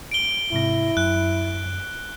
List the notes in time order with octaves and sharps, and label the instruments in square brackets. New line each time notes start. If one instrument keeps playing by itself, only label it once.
[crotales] D7 G7
[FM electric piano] G#2 C3 A#6 [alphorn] E4
[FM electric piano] F#2 [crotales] F#6